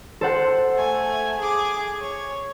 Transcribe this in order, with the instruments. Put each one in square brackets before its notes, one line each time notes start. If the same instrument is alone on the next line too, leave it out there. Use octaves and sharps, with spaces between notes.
[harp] A4 C5 F#5
[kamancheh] A3 G#5
G#4 D6
C#5